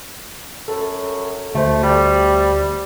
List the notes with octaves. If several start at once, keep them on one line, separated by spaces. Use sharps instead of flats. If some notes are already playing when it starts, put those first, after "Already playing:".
F#2 A4
D2 A3 C5
G3